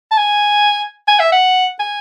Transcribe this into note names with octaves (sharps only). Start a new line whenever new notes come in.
A5
G#5
G#5
E5
F#5
G#5